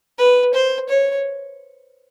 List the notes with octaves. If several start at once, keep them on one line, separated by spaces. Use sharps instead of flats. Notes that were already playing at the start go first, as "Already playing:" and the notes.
B4
C5
C#5